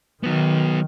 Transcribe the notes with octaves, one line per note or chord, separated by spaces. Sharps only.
D#3 F#3 B3